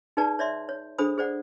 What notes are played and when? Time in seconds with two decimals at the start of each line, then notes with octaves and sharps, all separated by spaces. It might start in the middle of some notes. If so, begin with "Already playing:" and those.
0.17 D#4 G#4 B4 D5 A5
0.39 C#5 D5 E5 C6
0.69 C#5
0.98 D4 G#4 A4 C5 B5 D#6
1.18 G#4 C5 D5 F#5